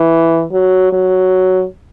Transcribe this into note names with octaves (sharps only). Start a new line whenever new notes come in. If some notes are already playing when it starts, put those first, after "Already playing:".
Already playing: E3
F#3
F#3